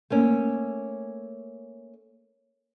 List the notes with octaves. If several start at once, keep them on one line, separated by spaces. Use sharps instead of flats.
A3 A#3 C#4